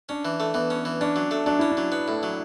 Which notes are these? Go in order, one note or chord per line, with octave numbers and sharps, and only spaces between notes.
C#4 D4
E3
A3
E3 B3
C#4
E3
C#4 D4
F#3
A3
F#3 D4
C#4 E4
D4
F#3
B3
A2
F#3